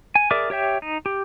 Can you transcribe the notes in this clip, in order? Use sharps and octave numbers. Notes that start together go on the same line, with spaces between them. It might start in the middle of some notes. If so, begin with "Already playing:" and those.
G#5
G#4 A#4 D5 E5 D6
G4 C#5 E5 G5
D#4
G4